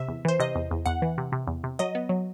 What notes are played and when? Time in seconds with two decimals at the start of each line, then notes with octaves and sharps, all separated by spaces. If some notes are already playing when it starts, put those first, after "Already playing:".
Already playing: C3 E5
0.08 E2
0.25 E3 C5
0.40 C3 D#5
0.55 E2
0.71 E2
0.86 E2 F#5
1.02 E3
1.18 C3
1.32 C3
1.47 E2
1.64 C3
1.79 F#3 D#5
1.95 B3
2.09 F#3